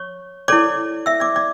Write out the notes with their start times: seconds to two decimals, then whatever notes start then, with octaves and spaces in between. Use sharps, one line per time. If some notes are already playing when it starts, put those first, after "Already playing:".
Already playing: C#5 C#6
0.48 E4 A4 C#5 D5 D6
1.06 E5 E6
1.20 D5 D6
1.36 D5 D6